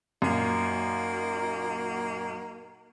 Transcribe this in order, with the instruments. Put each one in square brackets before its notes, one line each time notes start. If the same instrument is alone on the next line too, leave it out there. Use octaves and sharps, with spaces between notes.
[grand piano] F#2 A#2 [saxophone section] A#3 D#4 F#4